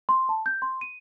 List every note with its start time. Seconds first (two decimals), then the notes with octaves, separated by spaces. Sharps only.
0.09 C6
0.29 A5
0.46 G6
0.62 C6
0.81 D#7